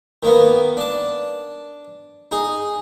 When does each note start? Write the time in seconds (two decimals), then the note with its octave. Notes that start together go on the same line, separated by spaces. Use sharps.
0.23 D#3 A#3 B3
0.77 D4 A5
2.31 D#4 G#4